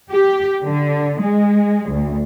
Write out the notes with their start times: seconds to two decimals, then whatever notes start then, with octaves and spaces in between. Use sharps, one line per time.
0.11 G4
0.64 D3
1.21 G#3
1.89 D2